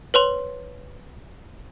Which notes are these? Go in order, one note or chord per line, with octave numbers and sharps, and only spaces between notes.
B4 C#5 C6